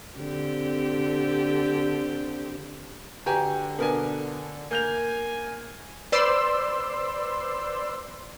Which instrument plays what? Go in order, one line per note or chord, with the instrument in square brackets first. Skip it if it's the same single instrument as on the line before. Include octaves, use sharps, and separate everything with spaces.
[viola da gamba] D3 C4 G4
[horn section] D3 [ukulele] F#4 G4 B4 [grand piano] G#5 A#5
[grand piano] B2 G#5 [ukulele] D4 A#4 B4
[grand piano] A#3 G6 F7 [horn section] G#5
[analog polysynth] B4 C5 D5 C6 E6